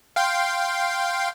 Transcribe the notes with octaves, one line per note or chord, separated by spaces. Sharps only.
F5 G5 C6